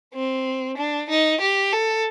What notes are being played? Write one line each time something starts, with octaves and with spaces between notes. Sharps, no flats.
C4
D4
D#4
G4
A4